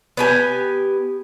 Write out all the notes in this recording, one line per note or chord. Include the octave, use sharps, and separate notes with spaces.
B3 G4 G#5